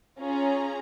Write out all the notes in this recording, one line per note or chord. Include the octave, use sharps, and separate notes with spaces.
C#4 F4 G#4 A#5